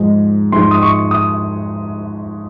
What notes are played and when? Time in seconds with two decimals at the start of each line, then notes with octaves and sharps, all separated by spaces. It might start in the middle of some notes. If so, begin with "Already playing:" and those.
Already playing: G#2 F3 G#3 D#4
0.52 G#2 F3 G#3 D#4 C6
0.71 D#6
0.82 C#6
1.11 D#6